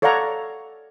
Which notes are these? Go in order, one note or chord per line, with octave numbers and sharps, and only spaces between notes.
A4 C#5 D5 F5 F#5 A#5